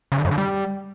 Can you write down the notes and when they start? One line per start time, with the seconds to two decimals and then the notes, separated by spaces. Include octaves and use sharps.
0.12 C#3
0.18 D3
0.25 F#2
0.31 D3
0.38 G3